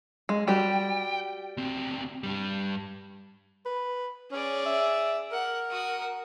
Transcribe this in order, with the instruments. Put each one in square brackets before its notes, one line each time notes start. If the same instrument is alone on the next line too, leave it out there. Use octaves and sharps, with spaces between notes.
[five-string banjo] G#3
[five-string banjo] G3 F#4 G4 [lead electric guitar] G5
[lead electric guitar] D2 C4
G2 G3
[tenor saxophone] B4
[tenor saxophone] C#4 [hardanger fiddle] G#4 D5
[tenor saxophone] E5
[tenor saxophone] A#4 [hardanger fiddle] F#5
[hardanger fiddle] F#4 D#6